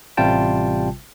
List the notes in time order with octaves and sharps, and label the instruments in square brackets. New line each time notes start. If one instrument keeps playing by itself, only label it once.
[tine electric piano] A1 C3 G3 F4 G5 A5